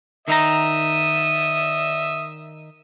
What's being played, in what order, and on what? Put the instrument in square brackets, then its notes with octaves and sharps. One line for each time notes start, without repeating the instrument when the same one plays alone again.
[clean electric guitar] D#3 D#4 A#5 [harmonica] E5 D#6